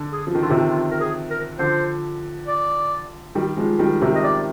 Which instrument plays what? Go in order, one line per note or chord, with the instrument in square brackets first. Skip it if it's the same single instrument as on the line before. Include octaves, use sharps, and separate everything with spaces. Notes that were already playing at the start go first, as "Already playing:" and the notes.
Already playing: [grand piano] D3
[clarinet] G#4
[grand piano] F3
D#3
[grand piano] D3 [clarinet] F4
[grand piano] C3 D#3
[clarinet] F4
A#4
G#4
A#4
[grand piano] D3 F3 [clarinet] C5
[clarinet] D5
[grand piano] D#3 G3
F3 G#3
D#3 G3
C3 D#3
[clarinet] D#5
D5